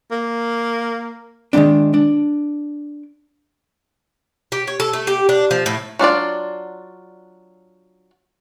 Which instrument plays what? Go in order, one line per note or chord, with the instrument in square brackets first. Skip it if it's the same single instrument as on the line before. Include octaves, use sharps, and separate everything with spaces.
[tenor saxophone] A#3
[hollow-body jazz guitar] D#3 G#3 A#3 C4 D4
D4
[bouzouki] G4
C#5
A4
A3
G4
D4
F3
A2
[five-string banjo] F#3 D4 F4 D5